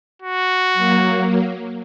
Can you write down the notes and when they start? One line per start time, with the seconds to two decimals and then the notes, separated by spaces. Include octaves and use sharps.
0.22 F#4
0.74 F#3 A#3